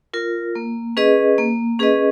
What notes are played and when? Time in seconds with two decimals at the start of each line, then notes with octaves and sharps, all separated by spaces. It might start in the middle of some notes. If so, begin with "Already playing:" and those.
0.14 F4 A#4
0.55 A#3
0.97 C#4 G#4 B4 D#5
1.38 A#3
1.79 C#4 G#4 B4 D#5